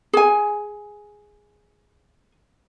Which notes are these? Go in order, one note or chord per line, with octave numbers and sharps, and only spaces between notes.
G#4 G#5